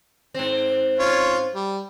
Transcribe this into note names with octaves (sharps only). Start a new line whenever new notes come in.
G#2 C4
C#4 F4
G3